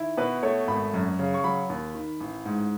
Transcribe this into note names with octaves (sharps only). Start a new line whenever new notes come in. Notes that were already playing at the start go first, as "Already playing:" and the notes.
Already playing: D#3 E4
B2 B4
A3 C#5
G#1 B5
F#2
C#3
C#6
F#3 B5
D#2
D#3
A1
G#2